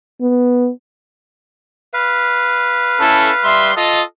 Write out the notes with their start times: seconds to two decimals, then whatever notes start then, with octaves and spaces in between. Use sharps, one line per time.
0.21 B3
1.93 B4 F5
3.00 C#4 E4 A4
3.44 G3 E5 C6
3.77 F4 A4 D#5